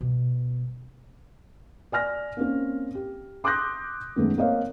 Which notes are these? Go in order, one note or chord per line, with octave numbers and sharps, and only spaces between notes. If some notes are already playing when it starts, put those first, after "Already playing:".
B2 G3
D5 G#5 F6 A#6
A#3 C4 C#4
G4
C6 D6 D#6 F#6 G6 A#6
F#2 D#3 G#3 A3 B3
A#3 C4 A#4 C#5 D#5 F5